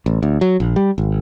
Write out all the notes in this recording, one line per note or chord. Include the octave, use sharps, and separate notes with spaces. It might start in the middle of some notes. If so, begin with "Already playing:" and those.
A1
D2
F#3
A#1
G3
G#1